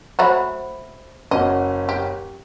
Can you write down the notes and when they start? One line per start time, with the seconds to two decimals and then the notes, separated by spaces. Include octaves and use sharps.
0.19 F#3 A3 F#4 C5 E5 B5
1.31 F#1 C#4 F#4 D#5
1.89 G4